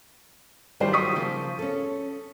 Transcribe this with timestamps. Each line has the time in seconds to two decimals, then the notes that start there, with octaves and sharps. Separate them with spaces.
0.80 D#3 F#3 G3 F4 C5 D5
0.93 C#6 D#6 B6
1.16 C#3 F3 A#3
1.59 C#4 A4